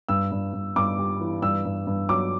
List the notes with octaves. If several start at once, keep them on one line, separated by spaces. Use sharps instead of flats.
G2 E6
G2
G2
G2 D6
G3
E3
G2 E6
G2
G2
F#3 D6